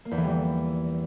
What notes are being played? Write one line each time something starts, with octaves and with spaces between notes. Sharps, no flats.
A#3
E2
E3
G3
E3